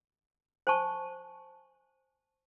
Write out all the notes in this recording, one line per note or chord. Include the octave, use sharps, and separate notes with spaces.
C5 G#5 A5 C#6